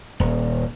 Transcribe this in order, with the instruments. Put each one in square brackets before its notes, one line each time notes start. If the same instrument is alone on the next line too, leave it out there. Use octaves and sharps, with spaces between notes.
[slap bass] D#1